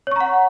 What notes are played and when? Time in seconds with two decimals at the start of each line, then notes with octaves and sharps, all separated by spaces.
0.07 C#5
0.11 C#6
0.16 A#5
0.20 F#5